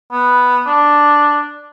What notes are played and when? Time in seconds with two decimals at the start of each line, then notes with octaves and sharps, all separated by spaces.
0.12 B3
0.67 D4